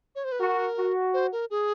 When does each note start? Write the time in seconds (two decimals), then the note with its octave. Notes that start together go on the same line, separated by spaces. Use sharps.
0.15 C#5
0.24 C5
0.32 B4
0.40 F#4 A#4
0.77 F#4
1.14 C5
1.32 A#4
1.51 G#4